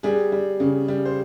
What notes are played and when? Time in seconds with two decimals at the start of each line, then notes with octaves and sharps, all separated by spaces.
0.03 G3 G#4
0.32 G3
0.60 C#3
0.88 G3
1.05 C5